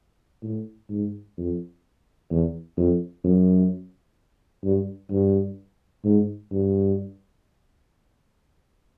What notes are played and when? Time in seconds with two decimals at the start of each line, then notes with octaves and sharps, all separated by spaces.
0.43 A2
0.90 G#2
1.37 F2
2.31 E2
2.77 F2
3.24 F#2
4.64 G2
5.11 G2
6.05 G#2
6.52 G2